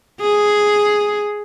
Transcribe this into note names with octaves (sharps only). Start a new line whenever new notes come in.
G#4